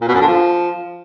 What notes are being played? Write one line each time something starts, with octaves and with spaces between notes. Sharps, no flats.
A#2
B2
F#2
D3
F3